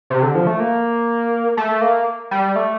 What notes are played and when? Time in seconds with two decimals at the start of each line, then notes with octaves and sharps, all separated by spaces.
0.10 C3
0.22 D3
0.35 F3
0.47 A3
0.60 A#3
1.57 A3
1.81 A#3
2.31 G3
2.56 A3